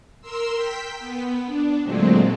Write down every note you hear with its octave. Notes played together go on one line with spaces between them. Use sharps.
A#4 C6 E6
G5 B6
B3
D4
A#2 D3 F#3 G#3 A3 C4